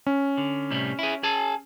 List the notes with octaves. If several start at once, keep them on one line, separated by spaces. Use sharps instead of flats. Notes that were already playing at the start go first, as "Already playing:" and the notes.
C#4
D3
A2 C3 G3
E4 G#4
G#4 G#5 A5